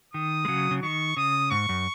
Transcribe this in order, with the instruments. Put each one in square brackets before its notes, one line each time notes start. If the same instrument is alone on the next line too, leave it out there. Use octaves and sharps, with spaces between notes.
[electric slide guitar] D#3 [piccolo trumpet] D#6
[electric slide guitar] G#3
C#3 F#3
C#3
[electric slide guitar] D#3 [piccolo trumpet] C#6
[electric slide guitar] C#3 [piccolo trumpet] D#6
[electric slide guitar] G#2 [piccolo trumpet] C#6
[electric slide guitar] F#2